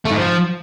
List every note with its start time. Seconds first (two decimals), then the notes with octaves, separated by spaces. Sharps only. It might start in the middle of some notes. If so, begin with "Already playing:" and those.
0.05 A3
0.11 G#2
0.16 F3